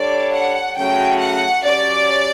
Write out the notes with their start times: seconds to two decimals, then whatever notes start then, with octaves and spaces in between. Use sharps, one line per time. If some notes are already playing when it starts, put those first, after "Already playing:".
Already playing: G3 D4 A4 C#5 D5
0.33 F#5
0.78 C#3 F#3 A3 C#4 F#4 G5
1.21 F#5
1.64 F#3 C#4 G4 C#5 D5